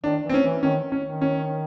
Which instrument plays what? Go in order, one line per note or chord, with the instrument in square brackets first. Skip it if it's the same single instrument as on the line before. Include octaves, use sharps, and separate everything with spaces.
[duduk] D#3 [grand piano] D4
[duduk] E3
[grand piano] C4
C#4
[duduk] E3
[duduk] D#3 [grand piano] C#4
[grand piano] C#4
[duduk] D#3
[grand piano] C#4